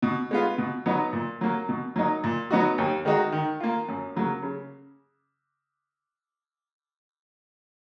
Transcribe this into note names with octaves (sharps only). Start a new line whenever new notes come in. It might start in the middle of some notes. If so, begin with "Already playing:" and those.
B2
G#3 B3 F4
B2
F#3 B3 D#4
A#2
F#3 A#3
B2
F#3 A#3 D#4
A#2
F#3 B3 D#4 F#4
D#2
D#3 G#3 D#4 F#4
D#3
A#3 F4
F#2
C#3 F#3 A#3
C#3